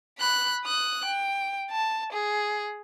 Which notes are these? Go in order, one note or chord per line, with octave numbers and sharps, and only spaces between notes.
B5 F#6
D#6 F#6
G5
A5
G#4